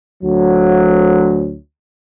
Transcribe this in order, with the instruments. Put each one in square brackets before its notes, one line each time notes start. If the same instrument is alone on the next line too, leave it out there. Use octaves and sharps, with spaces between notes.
[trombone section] D2 F#3